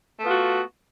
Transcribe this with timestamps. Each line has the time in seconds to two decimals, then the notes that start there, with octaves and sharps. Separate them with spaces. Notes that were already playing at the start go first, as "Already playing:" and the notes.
0.20 A3
0.23 B3
0.26 F4
0.29 F#4